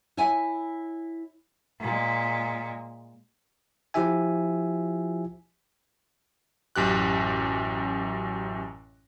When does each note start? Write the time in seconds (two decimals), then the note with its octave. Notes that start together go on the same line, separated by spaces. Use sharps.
0.17 E4 C#5 E5 G#5
1.80 A#2 G#3
3.94 F3 E4 F4 G4 E5 G#5
6.76 A1 F#2 G4 F#6